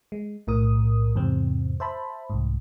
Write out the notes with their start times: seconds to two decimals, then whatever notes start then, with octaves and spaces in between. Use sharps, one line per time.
0.12 G#3
0.47 B1 A2 A#4 D#6
1.15 E2 G#2 C3 C4
1.80 C5 E5 A5 B5
2.30 C2 G#2